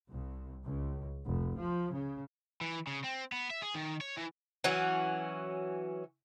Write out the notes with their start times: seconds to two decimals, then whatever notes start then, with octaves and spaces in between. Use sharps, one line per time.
0.10 C2
0.64 C#2
1.25 F1
1.58 F3
1.92 C#3
2.61 E3
2.87 C#3
3.04 C4
3.32 B3
3.51 E5
3.62 G#4
3.75 D#3
4.01 C#5
4.17 E3
4.64 E3 F#3 C#4 F#4